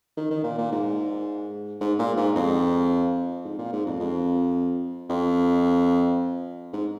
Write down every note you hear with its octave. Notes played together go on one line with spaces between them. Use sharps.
D#3
D#3
A#2
A#2
G#2
G#2
A#2
G#2
F2
G#2
A#2
G#2
F2
F2
F2
G#2